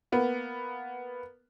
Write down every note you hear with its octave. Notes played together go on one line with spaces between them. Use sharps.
A#3 B3